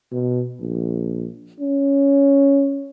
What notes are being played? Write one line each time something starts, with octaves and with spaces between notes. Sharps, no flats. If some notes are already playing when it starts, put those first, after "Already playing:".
B2
A#1
C#4